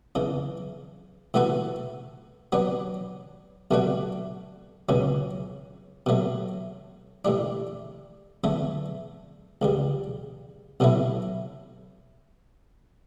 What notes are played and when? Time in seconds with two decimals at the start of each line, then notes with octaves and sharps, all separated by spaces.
0.15 E2 C#3 E3
1.34 A2 E3 B3 F#4 A4
2.52 F#3 B3 D4
3.71 B1 B2 A3 D4 F#4
4.89 C#2 B2 F#3 C#4
6.06 B2 F#3 A3
7.25 A2 G3 D4
8.44 E2 D3 A3
9.62 C#2 C#3 G3
10.80 B1 B2 F#3 A3 E4